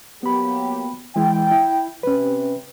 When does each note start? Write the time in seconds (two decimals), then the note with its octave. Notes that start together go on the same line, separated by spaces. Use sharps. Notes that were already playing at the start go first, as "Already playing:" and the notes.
0.23 F#3 A#3 B3 G4 B5
1.16 E3 G#3 E4 G5
1.51 E4
2.03 C3 C#4 B4